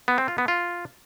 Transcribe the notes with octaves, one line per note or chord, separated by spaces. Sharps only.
B3
C4
F4
B3
F4